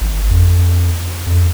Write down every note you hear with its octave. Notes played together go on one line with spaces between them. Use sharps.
G#1
F2
F2